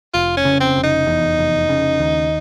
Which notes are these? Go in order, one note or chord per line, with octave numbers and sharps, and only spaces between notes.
F1 F4
C#4
C#3
C4
F1
D#4
E2
F1
C#3
D#2